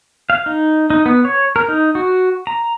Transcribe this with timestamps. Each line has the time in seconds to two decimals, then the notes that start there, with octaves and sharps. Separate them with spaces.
0.30 F5
0.46 D#4
0.90 D#4
1.06 B3
1.25 C#5
1.56 A#4
1.68 D#4
1.95 F#4
2.47 A#5